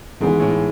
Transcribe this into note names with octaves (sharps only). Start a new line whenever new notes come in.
G#2 E3 G#3 B3 E4
A2